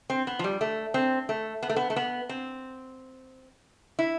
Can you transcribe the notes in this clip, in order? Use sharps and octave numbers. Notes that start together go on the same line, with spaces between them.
C4
B3
F3
G3
A3
C4
A3
B3
A3
B3
A3
B3
C4
E4